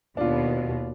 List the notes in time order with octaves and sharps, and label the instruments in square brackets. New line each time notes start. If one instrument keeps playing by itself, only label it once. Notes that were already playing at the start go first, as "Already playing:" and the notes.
[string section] D#2 B2 [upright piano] D4 F4